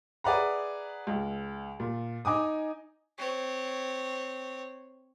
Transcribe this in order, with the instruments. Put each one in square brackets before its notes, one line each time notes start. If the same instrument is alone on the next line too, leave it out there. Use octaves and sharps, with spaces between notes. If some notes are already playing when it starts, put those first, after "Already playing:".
[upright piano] G#4 B4 D5 E5 F#5 A#5
C#2
A#2
D#4 G#5 D6 D#6
[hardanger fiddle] C4 C#5